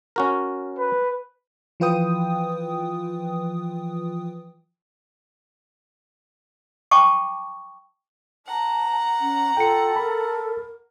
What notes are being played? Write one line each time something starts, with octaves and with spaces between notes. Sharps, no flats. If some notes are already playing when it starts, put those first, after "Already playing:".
C#4 F#4 A#4
B4
E3 F3 F4 B4 G5 D#6
G5 A5 C#6 D6
F#5 A5 A#5
C#4
F4 A4 G5 C#7
A#4 B5